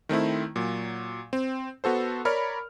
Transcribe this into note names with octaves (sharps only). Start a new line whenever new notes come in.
D#3 A3 C4 E4
A#2 F#3
C4
B3 F#4 A4 C5
A#4 C#5 D5 B5 F6